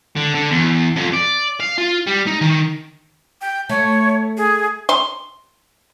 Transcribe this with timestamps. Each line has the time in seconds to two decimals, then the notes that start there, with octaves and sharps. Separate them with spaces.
0.16 D3
0.35 D3
0.51 E2
0.97 F2
1.14 D5
1.60 F5
1.78 F4
2.07 G3
2.27 D#4
2.41 D#3
3.41 G5
3.69 A3 C#5
4.37 G#4
4.89 C6